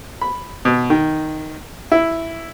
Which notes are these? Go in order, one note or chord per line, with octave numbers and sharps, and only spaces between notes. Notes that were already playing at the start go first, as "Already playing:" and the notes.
B5
B2
D#3
E4